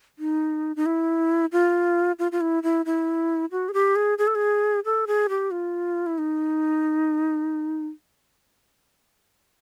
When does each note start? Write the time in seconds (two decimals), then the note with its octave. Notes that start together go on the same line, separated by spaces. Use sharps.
0.19 D#4
0.76 D#4
0.86 E4
1.52 F4
2.19 F4
2.32 F4
2.41 E4
2.63 E4
2.86 E4
3.52 F#4
3.69 G#4
3.74 G4
3.96 G#4
4.18 G#4
4.27 A4
4.35 G#4
4.85 A4
5.07 G#4
5.29 G4
5.51 F4
6.06 E4
6.18 D#4